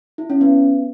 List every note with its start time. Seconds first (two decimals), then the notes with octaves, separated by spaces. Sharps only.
0.18 E4
0.30 C#4
0.41 B3